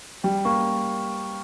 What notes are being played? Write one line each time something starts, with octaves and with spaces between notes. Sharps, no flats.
G3 G5
A#3 C#6